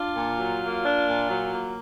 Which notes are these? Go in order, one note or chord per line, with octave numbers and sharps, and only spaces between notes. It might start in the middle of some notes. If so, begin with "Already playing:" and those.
Already playing: D4 F4
A#2
F#3
A#3
D4
A#2
F#3
A#3